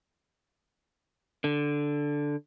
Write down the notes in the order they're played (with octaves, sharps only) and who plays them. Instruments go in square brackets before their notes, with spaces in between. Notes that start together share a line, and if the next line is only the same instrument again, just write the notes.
[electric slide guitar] D3